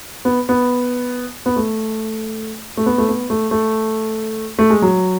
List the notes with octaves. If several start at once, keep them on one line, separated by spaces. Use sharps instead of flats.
B3
B3
B3
A3
A3
B3
A3
B3
A3
A3
A3
G#3
F#3